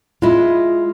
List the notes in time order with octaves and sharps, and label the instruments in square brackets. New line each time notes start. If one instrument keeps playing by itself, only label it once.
[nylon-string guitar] G#3 E4 [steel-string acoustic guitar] F4 D#5